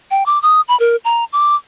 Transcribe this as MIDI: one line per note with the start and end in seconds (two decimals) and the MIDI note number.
0.11 0.26 79
0.26 0.41 86
0.42 0.61 87
0.68 0.78 83
0.80 0.96 70
1.05 1.24 82
1.33 1.55 86